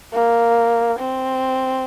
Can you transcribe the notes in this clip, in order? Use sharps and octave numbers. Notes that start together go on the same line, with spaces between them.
A#3
C4